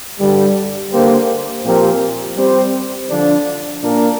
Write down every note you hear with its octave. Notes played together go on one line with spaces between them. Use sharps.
G2 D3 G3
D3 A#3 G4 C5
A#2 F3 C4 G4 A#4
G3 C4 G4 C5
D3 F3 D4
A#2 A#3 D4 A#4